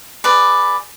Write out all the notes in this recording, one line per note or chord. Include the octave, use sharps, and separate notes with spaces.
G#4 B4 D5